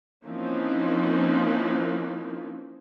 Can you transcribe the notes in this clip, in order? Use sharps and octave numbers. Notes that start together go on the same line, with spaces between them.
E3 F3 A#3 C4 C#4 D#4